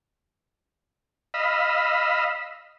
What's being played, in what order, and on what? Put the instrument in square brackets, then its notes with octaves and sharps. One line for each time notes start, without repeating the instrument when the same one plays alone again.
[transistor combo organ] D#5 F5 B5 E6